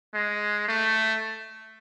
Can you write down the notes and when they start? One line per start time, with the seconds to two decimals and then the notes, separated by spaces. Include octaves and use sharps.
0.14 G#3
0.68 A3